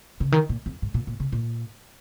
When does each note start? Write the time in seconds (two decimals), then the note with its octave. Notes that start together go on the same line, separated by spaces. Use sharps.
0.20 C#3
0.32 D#3
0.49 A#2
0.66 F2
0.82 G#2
0.94 A#2
1.07 A#2
1.20 C#3
1.32 A#2